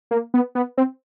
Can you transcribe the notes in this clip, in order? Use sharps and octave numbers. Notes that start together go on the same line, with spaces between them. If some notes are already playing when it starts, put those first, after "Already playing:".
A#3
B3
B3
C4